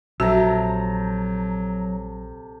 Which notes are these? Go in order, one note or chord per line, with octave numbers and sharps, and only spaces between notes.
A#1 C3 F#3 F#4 A4 A#5